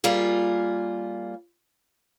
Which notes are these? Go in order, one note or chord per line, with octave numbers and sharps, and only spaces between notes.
G3 A#3 F4 G#4